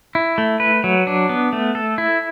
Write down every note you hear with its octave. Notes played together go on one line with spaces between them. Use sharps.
E4
A3
B4
F#3
D4
B3
A3
A4
E4